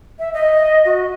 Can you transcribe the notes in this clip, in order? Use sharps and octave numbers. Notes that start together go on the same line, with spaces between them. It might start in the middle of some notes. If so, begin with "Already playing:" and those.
E5
D#5
F#4